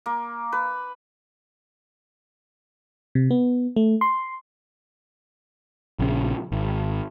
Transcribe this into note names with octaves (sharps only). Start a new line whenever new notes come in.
A#3
B4
C3
B3
A3
C6
A#1 C#3
G#1